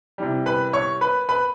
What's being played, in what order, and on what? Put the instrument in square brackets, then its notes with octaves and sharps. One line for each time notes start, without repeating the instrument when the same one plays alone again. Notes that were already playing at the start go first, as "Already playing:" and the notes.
[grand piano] C3 E3 G3
B4 B5
C#5 C#6
B4 B5
B4 B5